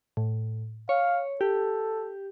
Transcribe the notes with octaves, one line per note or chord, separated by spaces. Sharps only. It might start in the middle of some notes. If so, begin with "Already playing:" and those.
A2
C#5 F5
G4 A4